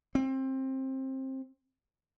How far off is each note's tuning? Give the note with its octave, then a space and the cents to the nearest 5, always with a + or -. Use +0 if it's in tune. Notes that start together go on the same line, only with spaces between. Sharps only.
C4 +20